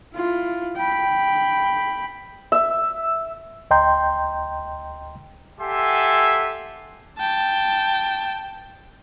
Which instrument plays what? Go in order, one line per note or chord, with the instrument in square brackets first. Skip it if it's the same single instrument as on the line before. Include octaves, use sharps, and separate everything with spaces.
[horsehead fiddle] E4 F4
G5 B5
[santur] E5
[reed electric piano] D2 D#5 G5 A#5 C6 G6
[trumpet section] G4 A4 E5 F#5 G#5 C6
[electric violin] G5 A5